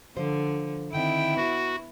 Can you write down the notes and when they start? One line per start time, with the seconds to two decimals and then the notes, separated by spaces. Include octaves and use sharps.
0.17 D3 F3 C5
0.93 D3 D#3 C4 E4 G5
1.37 B3 F#4